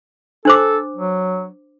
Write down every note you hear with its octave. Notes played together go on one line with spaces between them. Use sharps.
D4 A4 C5 D6
F#3